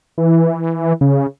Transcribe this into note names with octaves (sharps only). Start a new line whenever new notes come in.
E3
C#3